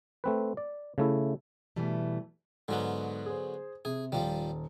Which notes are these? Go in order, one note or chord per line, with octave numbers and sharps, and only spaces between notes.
A3 C4 B4
D5
C#3 A3 E4
B2 E3 G3 A3
G#2 D3 F#3 B3
G#4 C5
C3 G#4
D#1 F3 G3